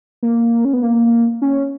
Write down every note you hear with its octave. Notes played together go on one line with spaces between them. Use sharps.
A#3
C#4
B3
A#3
C#4